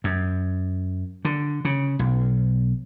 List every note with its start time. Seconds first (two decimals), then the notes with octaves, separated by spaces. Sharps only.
0.04 F#2
1.25 D3
1.65 C#3
1.99 B1